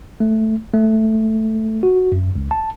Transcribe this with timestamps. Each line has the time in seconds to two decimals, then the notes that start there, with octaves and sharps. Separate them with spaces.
0.20 A3
0.73 A3
1.83 F#4
2.12 F#2
2.35 C#2
2.51 A5